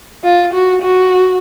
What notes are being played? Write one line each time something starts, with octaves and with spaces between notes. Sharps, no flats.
F4
F#4
F#4